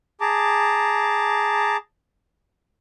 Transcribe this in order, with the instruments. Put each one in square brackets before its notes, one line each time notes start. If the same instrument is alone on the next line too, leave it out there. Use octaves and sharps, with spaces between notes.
[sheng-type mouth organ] G#4 A5 A#5 D6